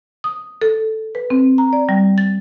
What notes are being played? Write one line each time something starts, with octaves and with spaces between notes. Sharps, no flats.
D#6
A4
B4
C4
A#5
D5
G3
A6